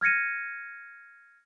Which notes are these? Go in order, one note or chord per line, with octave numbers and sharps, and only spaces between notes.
F6 G#6 A#6 C#7 D#7